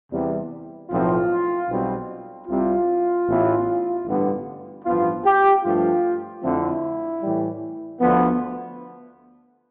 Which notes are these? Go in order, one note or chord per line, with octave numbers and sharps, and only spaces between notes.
E2 C3 G3
B1 A2 F3 C4 F4
B1 B2 G3 C4
C2 C3 G3 C4 F4
A1 A2 E3 B3
A1 G2 D3 G3 B3
A1 G2 F3 B3 F4
G4
G2 F3 A3 F4
F2 D3 F3 A3 C4 E4
A2 E3 G3
D2 D3 F3 B3